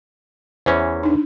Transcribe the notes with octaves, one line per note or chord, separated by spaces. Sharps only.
E2 E3 C#4 C5
D4 D#4